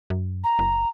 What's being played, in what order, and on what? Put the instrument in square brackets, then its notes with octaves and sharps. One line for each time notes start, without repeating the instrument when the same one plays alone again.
[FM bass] F#2
[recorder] A#5
[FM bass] F#1